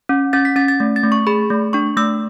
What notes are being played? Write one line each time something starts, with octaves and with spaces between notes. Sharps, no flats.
C#4
C#4 A6
B6
C#4 A6
A6
A3
A6
A3
C#6
G#4 B5
A3
D4 C#6
A3 E6